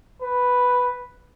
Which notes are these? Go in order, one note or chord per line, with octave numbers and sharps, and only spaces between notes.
B4